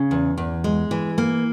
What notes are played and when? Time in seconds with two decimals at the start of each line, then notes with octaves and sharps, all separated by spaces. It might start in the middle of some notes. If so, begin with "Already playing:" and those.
Already playing: C#3
0.11 E2
0.38 E2
0.64 G#3
0.91 E3
1.18 A#3